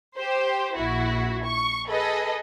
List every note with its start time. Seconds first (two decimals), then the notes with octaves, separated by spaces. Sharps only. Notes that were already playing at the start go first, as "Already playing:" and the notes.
0.16 G4 C5
0.75 A#1 E4 F#4
1.45 C#6
1.87 G#4 A4 B4 D#5